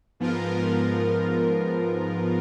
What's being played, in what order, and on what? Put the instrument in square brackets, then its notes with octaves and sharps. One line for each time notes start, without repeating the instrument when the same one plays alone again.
[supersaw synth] G#2 F3 B3 F4 A#4